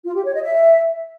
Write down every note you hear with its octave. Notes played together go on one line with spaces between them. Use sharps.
F4
G4
C#5
D#5
E5